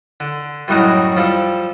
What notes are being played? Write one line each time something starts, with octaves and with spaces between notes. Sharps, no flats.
D3
F#2 A2 G3 D#4 F#4 F#5
F3 G3 A4